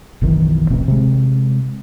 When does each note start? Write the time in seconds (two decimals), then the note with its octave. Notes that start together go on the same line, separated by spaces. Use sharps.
0.21 F#1 B1 D#3 E3
0.70 D1 A1 B2 C4
0.88 C3 G#3